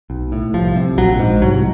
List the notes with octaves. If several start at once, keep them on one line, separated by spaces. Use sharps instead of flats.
B1
A2
C2 F3
C3
A#1 F#3
G#2
C2 F#3